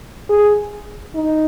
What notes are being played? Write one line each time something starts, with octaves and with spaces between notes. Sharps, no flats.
G#4
D#4